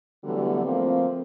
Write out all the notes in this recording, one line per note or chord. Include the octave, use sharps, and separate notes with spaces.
D3 E3 F#3 G3 A3 B3
F3 A3 A#3 C4